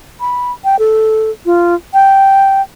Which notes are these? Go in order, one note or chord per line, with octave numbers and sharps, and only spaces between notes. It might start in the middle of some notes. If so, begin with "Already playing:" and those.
B5
G5
A4
F4
G5